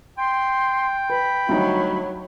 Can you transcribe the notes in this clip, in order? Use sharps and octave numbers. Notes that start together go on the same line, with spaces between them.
G5 C6
B4 B5
D2 F#3 G3 D#4